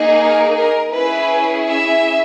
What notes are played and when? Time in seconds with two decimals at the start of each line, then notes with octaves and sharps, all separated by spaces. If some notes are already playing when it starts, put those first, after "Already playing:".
Already playing: A#3 D#4 G#4
0.19 A#4
0.56 A#4
0.93 C#4 E4 G#4 B4
1.67 E5